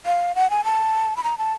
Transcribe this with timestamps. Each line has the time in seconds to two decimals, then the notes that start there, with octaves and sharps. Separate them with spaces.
0.06 F5
0.35 F#5
0.50 G#5
0.64 A5
1.17 B5
1.24 A#5
1.38 A5